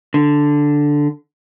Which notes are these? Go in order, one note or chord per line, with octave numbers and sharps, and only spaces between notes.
D3